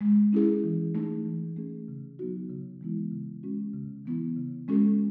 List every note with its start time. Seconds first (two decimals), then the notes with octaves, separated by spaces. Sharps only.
0.01 G#3
0.33 C#4 E4 G#4
0.64 E3
0.95 A3 D#4 G#4
1.25 E3
1.57 A3 C#4 G#4
1.88 C#3
2.19 F#3 B3 D#4 F#4
2.50 C#3
2.81 E3 G#3 B3 E4
3.12 C#3
3.43 G#3 C#4 F#4
3.74 C#3
4.06 E3 B3 E4
4.37 C#3
4.68 G#3 C#4 F#4 A4